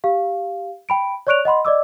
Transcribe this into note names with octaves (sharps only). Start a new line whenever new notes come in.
G4 F5
G5 B5 D7
C#5 D5 C#6 F#6 D7 F7
D#5 F#5 B5 C6
D5 D#5 D6 E6